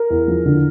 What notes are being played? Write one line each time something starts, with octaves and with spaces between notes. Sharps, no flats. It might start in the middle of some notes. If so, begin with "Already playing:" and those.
Already playing: A#4
E2
F3
D3